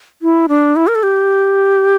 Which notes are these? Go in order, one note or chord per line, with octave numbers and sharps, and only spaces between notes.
E4
D4
E4
A#4
A4
G4